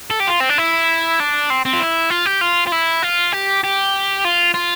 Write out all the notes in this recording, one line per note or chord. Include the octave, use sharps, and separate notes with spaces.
A4
G4
F4
C4
D4
E4
D4
C4
C4
F4
E4
F4
G4
F4
F4
E4
F4
G4
G4
F4
F4